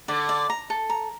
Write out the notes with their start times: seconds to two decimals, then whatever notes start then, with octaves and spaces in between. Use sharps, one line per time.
0.08 D3 D5
0.29 D5
0.50 A#5
0.70 A4
0.89 A#5